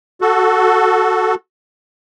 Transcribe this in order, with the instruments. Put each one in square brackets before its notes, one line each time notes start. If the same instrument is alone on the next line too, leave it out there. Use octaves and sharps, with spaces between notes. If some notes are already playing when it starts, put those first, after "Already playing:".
[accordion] F#4 A4